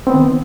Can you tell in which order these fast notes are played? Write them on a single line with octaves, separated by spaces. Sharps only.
C4 B3 D#3